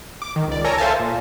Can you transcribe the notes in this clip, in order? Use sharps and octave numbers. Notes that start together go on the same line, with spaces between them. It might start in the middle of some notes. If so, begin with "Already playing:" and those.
D6
D#3
C#2 D5
A4 A#4 C#5 G#5 A#5
A4 C5 E5 F5 G#5 A5
A#2